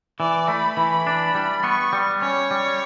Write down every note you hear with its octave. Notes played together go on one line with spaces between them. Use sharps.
E3 D5
A3 B5
E3
D4
G3
B3 C#6
G3
C#4 C#5
G3